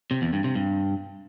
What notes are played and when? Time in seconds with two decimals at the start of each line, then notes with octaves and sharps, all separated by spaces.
0.11 C3
0.22 E2
0.33 G2
0.44 C3
0.55 G2